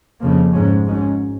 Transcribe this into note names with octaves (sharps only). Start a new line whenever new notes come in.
F2 C#3 F3 A#3
G#2 G#3 C#4
G#1 G#2 G#3 C#4